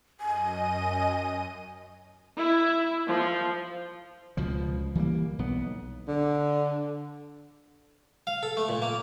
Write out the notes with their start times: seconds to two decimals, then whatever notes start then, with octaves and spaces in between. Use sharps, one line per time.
0.20 F#2 D#5 G#5 D#7
2.36 E4
3.08 F3
4.37 C#2 B2 F3
4.95 E3 G3 A3 A#3
5.39 B1 B3
6.08 D3
8.27 F5
8.43 A4
8.57 A3
8.69 A#2
8.82 A#3